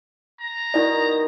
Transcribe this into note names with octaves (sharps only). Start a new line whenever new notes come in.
A#5
B2 D#3 E4 D5